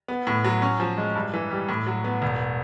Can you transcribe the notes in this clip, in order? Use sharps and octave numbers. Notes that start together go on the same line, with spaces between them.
B3
A2
F#3
C#4
F3
G#3
G2
E3
G3
A2
F#3
B3
E1